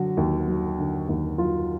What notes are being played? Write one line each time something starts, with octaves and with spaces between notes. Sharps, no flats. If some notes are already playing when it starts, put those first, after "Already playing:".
Already playing: D3 F#3 F#4
D#2
F#3
D3
D#2
F#3 F4